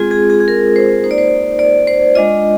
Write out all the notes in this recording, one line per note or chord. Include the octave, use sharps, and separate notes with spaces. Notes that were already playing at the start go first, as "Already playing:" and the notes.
Already playing: G#3 C4 F4 G#4
G#4
G#4
G#4
A#4
C5
A#3 D#4 C5
D5
C5
D5
C5
G#3 D4 F4 D#5